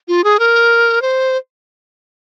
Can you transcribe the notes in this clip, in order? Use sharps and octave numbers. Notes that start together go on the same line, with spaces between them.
F4
G#4
A#4
C5